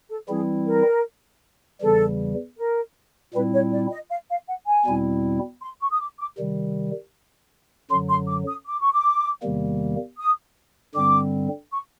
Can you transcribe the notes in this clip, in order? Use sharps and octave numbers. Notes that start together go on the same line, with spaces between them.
A4
E3 G3 C4 E4 G#4
A#4
E2 C#3 E3 G3 A4
A#4
A#2 G3 C4 E4 B4
C#5
D5
D#5
F5
F5
F#5
G#5
E2 B2 G3 C4 E4
C6
C#6
D#6
D6
D6
C3 D#3 G3
F#2 D3 F#3 C6
C6
D6
D#6
D6
C#6
D6
E2 C3 D#3 G3 A#3
D#6
G2 D3 G3 C4 D6
C#6